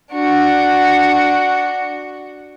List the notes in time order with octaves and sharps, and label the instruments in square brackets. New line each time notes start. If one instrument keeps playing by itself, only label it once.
[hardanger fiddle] D4 F#4